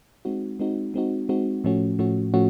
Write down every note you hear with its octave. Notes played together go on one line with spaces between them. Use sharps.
G#3 C4 D#4 F#4
G#3 C4 D#4 F#4
G#3 C4 D#4 F#4
G#3 C4 D#4 F#4
A2 F3 A3 C#4 F#4
A2 F3 A3 C#4 F#4
A2 F3 A3 C#4 F#4